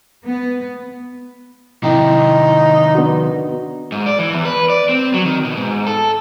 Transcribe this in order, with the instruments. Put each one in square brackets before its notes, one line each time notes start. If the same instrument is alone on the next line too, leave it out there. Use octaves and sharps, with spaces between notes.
[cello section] B3
[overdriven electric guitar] C3 D#3 [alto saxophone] D#4 [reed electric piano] E4 G5
[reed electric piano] B3 D4 F#4
[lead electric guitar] G#2
D5
E3
E2
B4
D5
C4
F#3
D#3
B2
G#2
A4